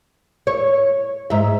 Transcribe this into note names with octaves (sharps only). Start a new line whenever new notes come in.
C#5
G#2 E5